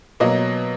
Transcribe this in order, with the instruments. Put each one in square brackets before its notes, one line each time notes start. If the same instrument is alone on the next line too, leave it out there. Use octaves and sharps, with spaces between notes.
[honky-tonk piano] B2 F#3 A#3 D#5